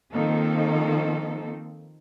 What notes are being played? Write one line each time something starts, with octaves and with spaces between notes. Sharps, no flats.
D#3 F3 A#3 C4 D#4 A4